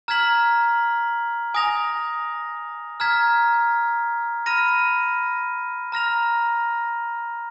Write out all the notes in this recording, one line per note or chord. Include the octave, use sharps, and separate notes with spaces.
A#5 F6 G#6 B6 F#7
G#5 D#6 A#6 F7
A#5 F6 G#6 B6
B5 F6 A#6 D#7
A#5 F6 A#6 F7